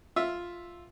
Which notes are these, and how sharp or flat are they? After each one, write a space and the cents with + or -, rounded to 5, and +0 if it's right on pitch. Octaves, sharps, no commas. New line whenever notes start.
F4 +0 E5 +0